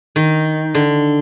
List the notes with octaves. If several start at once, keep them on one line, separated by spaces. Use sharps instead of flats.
D#3
D3